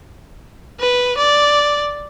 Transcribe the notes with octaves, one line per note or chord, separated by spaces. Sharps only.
B4
D5